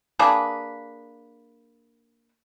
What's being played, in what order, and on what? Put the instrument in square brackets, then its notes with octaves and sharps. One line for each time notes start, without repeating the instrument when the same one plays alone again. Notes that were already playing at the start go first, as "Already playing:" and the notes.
[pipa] A#3 D4 G#4 B4